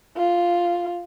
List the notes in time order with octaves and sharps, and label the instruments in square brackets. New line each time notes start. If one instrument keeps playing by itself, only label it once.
[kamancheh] F4